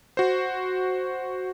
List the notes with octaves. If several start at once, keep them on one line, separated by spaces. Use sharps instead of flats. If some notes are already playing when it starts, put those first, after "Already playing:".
F#4 C5